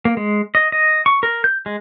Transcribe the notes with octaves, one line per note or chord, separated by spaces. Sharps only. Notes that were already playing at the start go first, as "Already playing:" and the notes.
A#3
G#3
D#5
D#5
C#6
A#4
G6
G#3